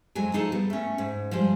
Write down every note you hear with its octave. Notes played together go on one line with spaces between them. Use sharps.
F2 F#3 G#3 G#5
F3 D#4 G#4 A4
G3 B3
A3 C#4
G#2
F3 G3 G#3